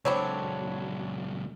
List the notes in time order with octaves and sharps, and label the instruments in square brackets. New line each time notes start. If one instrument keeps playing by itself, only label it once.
[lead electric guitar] C#2 F#3 [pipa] D3 C4 D4 [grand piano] C#5 B5